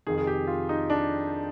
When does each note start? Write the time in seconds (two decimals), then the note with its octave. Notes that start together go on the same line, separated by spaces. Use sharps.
0.07 F2 C3 D#3 G#4
0.18 G#4
0.27 G4
0.47 F4
0.69 D#4
0.90 D4